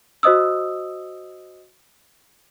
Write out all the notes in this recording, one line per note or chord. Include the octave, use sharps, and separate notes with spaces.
F#4 C5 D#5 D#6 E6